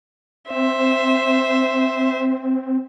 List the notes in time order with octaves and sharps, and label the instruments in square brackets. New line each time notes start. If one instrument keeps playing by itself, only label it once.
[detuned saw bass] C4 [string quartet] C5 E5